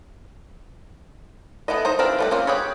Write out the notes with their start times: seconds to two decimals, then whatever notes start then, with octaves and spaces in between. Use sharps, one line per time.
1.68 A3 B3 E4 D#5
1.85 D#4 C5 A#5
1.99 E3 C4 D4 F4 A#4
2.19 G3 A3 B4
2.31 A#3 C4 C#4 F4
2.47 G4 G#4 B4 C#5